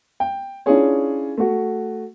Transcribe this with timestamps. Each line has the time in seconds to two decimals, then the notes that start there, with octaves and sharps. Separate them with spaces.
0.20 G5
0.66 C#4 D4 E4 F4 G#4 C#5
1.37 A3 F#4